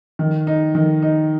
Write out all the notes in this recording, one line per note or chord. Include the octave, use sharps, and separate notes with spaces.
D#3
D#4
D#3
D#4